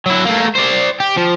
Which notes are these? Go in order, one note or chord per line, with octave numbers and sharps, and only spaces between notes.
F#3 E4
A3 A#3
C5 D5
G4
F3